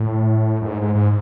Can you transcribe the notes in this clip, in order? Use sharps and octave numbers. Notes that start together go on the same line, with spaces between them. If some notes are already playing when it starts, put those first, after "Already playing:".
Already playing: A2
F#2
G#2
G#2
G#2